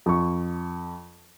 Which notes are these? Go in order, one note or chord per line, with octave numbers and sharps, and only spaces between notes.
F2 C#6